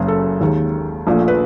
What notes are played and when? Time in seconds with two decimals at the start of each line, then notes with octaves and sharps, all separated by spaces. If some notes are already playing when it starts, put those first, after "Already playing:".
Already playing: F#1 F#2 C#3 G#4
0.08 A4
0.41 D#2 D#3 G#3
1.07 A#1 A#2 F3 A3
1.28 B4